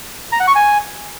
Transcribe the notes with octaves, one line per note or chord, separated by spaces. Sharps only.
A#5
F#5
C#6
G#5